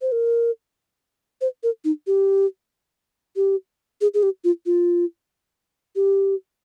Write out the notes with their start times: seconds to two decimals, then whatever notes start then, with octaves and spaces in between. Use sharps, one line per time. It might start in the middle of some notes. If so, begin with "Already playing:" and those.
0.02 C5
0.12 A#4
1.41 C5
1.63 A#4
1.84 D#4
2.07 G4
3.36 G4
4.01 G#4
4.14 G#4
4.23 G4
4.44 F4
4.66 F4
5.96 G4